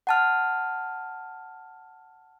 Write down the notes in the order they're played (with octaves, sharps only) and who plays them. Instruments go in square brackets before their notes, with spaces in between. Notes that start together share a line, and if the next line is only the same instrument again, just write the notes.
[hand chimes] F#5 A5 F6